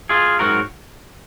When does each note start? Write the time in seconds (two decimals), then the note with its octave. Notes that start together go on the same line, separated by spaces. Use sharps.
0.09 F4 G#4
0.39 G#2 F#3 C4 F#4 A#4